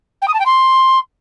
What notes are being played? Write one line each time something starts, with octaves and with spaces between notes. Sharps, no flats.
G5
D#6
A5
G5
C6